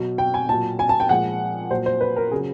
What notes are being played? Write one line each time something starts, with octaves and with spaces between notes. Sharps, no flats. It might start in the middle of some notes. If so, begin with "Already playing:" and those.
Already playing: B2 F#3
G5
G#5
A#2 F#3 A5
G#5
A5
G5
A#2 F3 G#3 F#5
A#2 F#3 C5
C5
B4
A#4
C#3 F#3 G#4